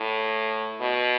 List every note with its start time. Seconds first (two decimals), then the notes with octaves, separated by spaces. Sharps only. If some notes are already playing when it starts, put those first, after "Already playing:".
Already playing: A2
0.80 B2